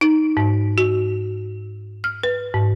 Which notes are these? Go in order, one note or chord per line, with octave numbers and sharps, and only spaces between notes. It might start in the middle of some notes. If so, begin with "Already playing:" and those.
D#4
G#2
F#4
F6
B4
G#2